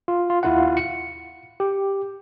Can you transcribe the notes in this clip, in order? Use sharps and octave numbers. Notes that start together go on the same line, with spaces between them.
F4
F4
D#2 E4 F4 F5 F#5
C#7
G4